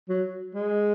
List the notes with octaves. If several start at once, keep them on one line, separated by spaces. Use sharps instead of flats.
F#3
G#3